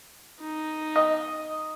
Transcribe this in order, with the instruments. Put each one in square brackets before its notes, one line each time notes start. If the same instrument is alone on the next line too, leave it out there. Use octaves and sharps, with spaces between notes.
[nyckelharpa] D#4
[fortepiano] D#5